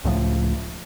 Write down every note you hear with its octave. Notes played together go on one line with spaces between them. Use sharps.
C#2 A2 F3